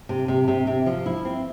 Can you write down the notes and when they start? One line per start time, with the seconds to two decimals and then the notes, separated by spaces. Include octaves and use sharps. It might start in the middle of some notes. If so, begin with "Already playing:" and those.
0.09 C3
0.28 C3
0.48 C3
0.67 C3
0.86 F3
1.06 E4
1.25 C4